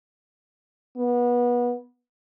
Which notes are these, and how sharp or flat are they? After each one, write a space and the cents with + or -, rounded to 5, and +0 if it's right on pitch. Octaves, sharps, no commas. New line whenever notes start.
B3 -25